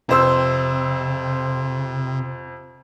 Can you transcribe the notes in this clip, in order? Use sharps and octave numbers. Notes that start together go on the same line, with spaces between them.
F2 C3 C5 E6